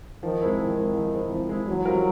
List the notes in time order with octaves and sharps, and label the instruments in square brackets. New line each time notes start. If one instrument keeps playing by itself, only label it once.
[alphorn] D#3 [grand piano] F3
[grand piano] G#3 C4 E4
[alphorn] D#3 [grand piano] F3
[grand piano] G#3 C4 E4
F3
G#3 C4 E4
F3
G#3 C4 E4
[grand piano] E3 [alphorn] F#3
[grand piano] G3 C4 F4 A#4